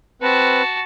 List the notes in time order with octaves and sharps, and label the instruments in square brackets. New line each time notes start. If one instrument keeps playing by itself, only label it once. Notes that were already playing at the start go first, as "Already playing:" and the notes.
[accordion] C4 B4 [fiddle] F#4 A5